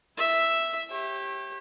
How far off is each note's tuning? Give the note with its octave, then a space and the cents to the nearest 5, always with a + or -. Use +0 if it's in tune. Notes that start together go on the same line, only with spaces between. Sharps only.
E4 +0 E5 +0
G4 +0 C#5 -40